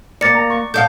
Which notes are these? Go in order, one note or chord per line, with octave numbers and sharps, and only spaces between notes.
A#3 D5 D6 A6 C#7
A#5
C#6
A4 D5 F5 G6